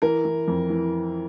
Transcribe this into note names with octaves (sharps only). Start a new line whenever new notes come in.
E3 A#4
E3
F2
E3